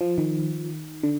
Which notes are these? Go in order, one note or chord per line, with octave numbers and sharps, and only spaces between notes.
F3
D#3
D3